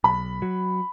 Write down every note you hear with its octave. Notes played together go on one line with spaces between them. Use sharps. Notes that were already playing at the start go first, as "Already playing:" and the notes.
B1 B5
F#3